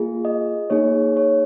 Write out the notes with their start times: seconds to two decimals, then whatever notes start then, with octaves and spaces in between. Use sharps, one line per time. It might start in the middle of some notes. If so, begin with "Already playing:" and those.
Already playing: A#3 F4 G#4
0.25 D#5
0.70 A#3 D#4 G#4 C#5
1.17 C#5